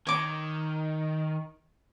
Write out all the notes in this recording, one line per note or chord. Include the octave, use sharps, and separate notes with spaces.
D#3 C#5 D6